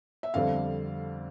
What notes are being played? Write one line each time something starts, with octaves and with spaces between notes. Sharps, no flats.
E5
F2 D3 G3 C4 F5